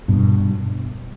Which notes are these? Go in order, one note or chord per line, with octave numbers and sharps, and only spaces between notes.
G2 B2